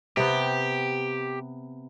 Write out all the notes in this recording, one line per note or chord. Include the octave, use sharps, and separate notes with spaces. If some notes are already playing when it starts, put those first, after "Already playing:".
C3 B3 G4